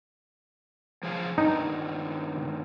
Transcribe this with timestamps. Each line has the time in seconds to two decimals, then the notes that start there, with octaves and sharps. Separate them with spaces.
1.03 F3 G#4 F5
1.38 G2 D#3 D#4